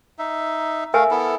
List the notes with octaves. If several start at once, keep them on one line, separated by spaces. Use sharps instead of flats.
D#4 E5
A3 A#4 E5 F5 G#5
B3 E4 A4